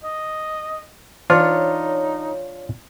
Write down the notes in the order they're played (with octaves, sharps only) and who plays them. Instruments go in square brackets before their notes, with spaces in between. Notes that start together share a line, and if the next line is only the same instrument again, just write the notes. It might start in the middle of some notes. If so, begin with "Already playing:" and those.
[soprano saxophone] D#5
[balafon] E3 [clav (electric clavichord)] D4 F4 [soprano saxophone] D#4 [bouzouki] C#5